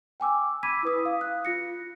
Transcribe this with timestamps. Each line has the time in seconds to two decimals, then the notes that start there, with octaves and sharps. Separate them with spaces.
0.20 G5 G#5 D6 E6
0.63 B5 D6 E6 G#6 B6 D#7
0.83 E4 B4 D#6
1.06 F5
1.21 F#6
1.45 F4 A#6 C#7